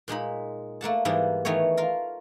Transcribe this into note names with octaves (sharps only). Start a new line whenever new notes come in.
A#2 G#3 D#4 B5
A3 A#3 F#5 A5
G#2 E3 G3 A#3 B3
D#3 E3 A3 B3 C#5
F4 A#4